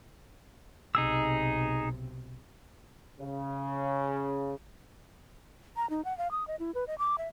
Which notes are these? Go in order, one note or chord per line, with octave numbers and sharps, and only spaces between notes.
B1 C3 D#4 G#4 E6
C#3
A#5
D#4
F#5
F5
D#6
D#5
E4
B4
D#5
D6
E5